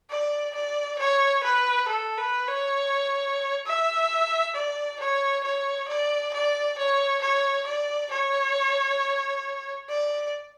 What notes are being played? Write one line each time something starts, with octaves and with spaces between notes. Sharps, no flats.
D5
D5
C#5
B4
A4
B4
C#5
E5
D5
C#5
C#5
D5
D5
C#5
C#5
D5
C#5
D5